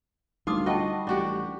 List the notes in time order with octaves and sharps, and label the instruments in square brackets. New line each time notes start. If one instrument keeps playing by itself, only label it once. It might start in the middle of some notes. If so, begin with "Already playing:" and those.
[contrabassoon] D2 [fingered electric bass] G3 [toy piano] D#4 D6 D#6 [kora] F4
[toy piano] F4 G5 A5 [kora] F#4 D#5
[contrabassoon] A1 [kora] D4 F#4 G4